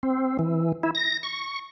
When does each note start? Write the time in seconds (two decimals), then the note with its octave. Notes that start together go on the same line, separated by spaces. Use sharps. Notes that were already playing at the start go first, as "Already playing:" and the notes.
0.03 C4
0.39 E3
0.83 E4
0.95 A#6
1.23 C#6